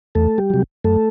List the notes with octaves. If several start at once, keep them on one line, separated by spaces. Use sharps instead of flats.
E2 A3 A4
G3 G4
C3 F#3
F#2 A3 A4